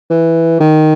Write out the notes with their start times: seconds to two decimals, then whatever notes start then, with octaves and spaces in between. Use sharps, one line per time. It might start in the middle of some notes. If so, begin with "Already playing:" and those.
0.10 E3
0.60 D#3